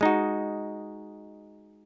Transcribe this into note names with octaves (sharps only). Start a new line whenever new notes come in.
G#3 D#4 F#4